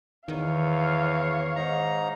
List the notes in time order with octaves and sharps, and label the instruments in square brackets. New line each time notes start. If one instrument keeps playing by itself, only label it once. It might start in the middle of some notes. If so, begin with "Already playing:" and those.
[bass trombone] E2 [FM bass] D#3 [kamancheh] C#5 F5
[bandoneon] G#2 D#4 A#5